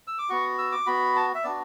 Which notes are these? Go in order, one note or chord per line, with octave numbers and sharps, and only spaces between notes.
E6
D6
B3 F#4 C#6
E6
D6
B3 F#4 B5
A5
E5
B3 D4 F#4 D5